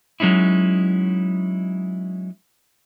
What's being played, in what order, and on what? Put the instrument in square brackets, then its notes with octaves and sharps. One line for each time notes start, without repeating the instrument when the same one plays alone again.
[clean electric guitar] F#3 G#3 C#4 D#4 E4